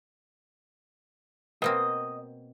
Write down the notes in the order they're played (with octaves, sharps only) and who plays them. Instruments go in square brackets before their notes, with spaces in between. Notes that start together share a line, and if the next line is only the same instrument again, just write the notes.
[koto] B2 A#3 C4 [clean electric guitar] D#5